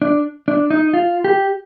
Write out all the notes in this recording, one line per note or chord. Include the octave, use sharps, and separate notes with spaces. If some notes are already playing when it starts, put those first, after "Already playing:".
D4
D4
D#4
F4
G4